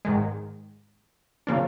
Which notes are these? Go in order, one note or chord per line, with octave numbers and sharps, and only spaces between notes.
G#2 D#3 G#3
C#3 F3 A#3 D4